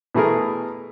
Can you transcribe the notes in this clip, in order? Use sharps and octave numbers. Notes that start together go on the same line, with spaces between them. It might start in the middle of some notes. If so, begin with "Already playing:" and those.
B2 E3 A3 G#4 A#4